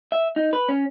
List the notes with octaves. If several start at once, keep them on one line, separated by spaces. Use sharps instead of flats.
E5
D#4
B4
C#4